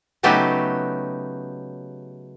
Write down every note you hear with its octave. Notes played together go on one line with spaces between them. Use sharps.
C#3 F#3 A3 B3 D#4 G4